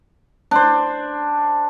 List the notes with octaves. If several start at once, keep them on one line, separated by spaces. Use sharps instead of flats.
D4 C5